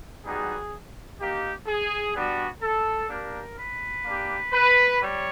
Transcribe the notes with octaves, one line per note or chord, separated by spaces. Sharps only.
G3 B3 D#4 F#4 G#4
A#3 D#4 G4
G#4
G3 B3 D4 F#4
A4
A#3 D4 G4 A#4
B4
A#3 D4 G4
B4
G3 C#5